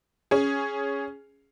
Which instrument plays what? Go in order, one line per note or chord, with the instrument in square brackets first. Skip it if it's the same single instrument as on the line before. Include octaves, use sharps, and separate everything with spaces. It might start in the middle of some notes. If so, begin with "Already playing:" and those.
[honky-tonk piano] C#4 G#4